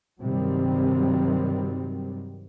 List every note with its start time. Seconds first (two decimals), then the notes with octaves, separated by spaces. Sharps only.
0.22 G2 C3 D#3 F#3 G3 C4